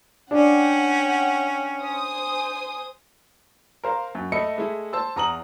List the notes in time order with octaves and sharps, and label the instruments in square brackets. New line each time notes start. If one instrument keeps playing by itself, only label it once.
[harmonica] C#4 [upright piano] D4 [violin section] F#5 G5
[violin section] C5 G#5 D#6
[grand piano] A#4 C5 F5
F#2
A3 D#5 E5 B5 C#7
G#3 A3 E4
C5 A5 E6
E2 A#5 D#6 F#7